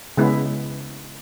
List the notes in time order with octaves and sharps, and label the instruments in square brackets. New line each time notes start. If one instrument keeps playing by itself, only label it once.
[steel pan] C#3 G#3 B3 E4